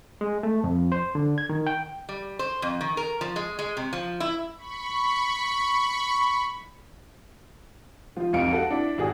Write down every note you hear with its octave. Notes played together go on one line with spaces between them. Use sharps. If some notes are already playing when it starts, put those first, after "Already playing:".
G#3
A3
F2
C5
D3
G#6
D#3
G5
G3
C5
F2
D#3
A#4
F3
G#3
G#3
C3
F3
E4
B5 C#6
F3 F4
C2 F2 D#4 F5 C#7 D7
F#4 A4 F5 F#5
D4 E4
G#1 F#4 G#4